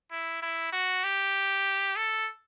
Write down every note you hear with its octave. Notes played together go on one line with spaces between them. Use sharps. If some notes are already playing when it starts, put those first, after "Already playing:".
E4
E4
F#4
G4
A4